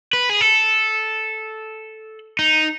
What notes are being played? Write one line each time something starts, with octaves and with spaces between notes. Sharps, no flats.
B4
G#4
A4
D#4